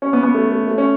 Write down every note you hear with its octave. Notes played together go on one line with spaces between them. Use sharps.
C#4
B3
B3
A3
A3
A3
C#4